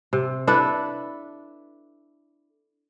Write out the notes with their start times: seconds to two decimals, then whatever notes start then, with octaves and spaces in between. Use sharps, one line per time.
0.13 C3
0.47 D4 E4 A4 B4